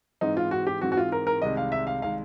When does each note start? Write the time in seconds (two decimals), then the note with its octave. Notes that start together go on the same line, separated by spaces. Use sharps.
0.21 G#2 E3 G#3 C4 D#4
0.37 F4
0.51 F#4
0.67 G4
0.81 G#2 E3 G#3 C4 F#4
0.92 F#4
0.97 F4
1.12 A#4
1.27 A#4
1.42 C2 C3 D#3 G#3 D#5
1.57 F5
1.72 E5
1.87 F5
2.02 C3 D#3 G#3 F5